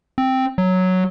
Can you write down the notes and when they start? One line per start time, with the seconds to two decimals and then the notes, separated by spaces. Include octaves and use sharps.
0.18 C4
0.58 F#3